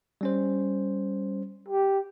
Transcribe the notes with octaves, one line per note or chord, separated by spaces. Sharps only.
G3 C#4 C5
G4